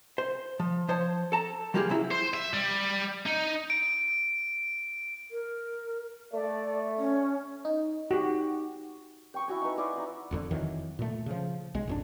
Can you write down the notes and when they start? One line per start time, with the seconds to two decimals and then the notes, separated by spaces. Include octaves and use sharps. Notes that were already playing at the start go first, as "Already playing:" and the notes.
0.18 C5
0.60 F3
0.88 F3 C5 C#5 A5
1.32 A4 A5 A#5
1.74 F#3 G3 A#3 F4 G4 G#4
1.90 C#3 F#3 E4
2.11 C5
2.34 E5
2.53 G3
3.26 D#4
3.70 D7
5.31 A#4
6.32 A3 D5
6.98 C#4
7.65 D#4
8.11 F#4 G4
9.34 G5 C#6 D#6
9.48 E4 F#4 G#5
9.62 D#4 B4
9.77 E4 F4 D5 D#6
9.93 D#4 F#5
10.31 E1 F2 D3
10.51 F2 D#3 E3 F#3
10.99 A#2 A3
11.26 C#3 F3
11.74 B1 G#3
11.87 G#1 F2 D4